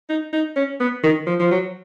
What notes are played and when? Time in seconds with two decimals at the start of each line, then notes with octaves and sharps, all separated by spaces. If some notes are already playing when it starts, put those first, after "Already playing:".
0.09 D#4
0.33 D#4
0.57 C#4
0.80 B3
1.03 D#3
1.27 F3
1.40 F3
1.51 F#3